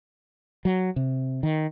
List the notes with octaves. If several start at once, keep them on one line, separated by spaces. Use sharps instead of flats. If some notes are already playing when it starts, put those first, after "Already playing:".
F#3
C3
D#3